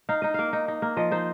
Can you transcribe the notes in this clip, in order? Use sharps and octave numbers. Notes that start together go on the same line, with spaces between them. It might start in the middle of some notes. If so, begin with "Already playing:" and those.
D#4 F5
D#4 D#5
A#3 F5
D#4
D#4
A#3
F3 D#5
D#4 C5